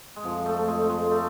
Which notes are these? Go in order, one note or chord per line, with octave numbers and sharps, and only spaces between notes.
G#3
F2 F3
A3
G#3
A3
G#3
A3